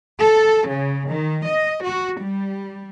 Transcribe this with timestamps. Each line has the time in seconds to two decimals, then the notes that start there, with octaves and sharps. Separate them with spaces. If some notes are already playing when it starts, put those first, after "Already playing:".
0.19 A4
0.68 C#3
1.08 D#3
1.46 D#5
1.84 F#4
2.19 G3